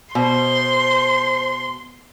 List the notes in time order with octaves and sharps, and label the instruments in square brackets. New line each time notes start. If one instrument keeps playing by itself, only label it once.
[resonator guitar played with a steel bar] B2 [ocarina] C5 [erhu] C6